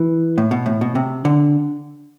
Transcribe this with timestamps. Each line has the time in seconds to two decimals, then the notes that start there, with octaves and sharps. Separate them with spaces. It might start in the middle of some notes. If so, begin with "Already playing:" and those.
Already playing: E3
0.38 A2
0.51 B2
0.66 A2
0.81 B2
0.95 C3
1.25 D3